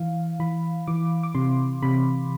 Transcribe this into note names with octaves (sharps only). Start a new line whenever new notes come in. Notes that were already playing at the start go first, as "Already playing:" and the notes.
Already playing: E3 F5
E3 B5
E3 D6
D6
C3 C6
C3 B5